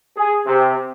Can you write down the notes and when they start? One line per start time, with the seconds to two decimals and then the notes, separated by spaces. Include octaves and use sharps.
0.17 G#4
0.46 C3